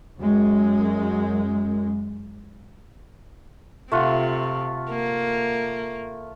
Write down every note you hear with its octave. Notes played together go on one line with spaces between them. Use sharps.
F#2 G#3
C3 A3 F4 F#5
A#3